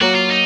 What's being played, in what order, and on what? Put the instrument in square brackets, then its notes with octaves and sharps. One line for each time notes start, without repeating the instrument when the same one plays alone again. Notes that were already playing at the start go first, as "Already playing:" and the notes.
[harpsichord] F#3 A#3 [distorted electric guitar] F#4
[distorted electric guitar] F4
D#4